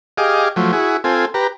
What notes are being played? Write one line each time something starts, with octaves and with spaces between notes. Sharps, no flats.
G4 G#4 D#5 F5 D6
F3 F#3 A3
E4 F#4 G#4
C4 F4 A4 G#5
G4 B4 A#5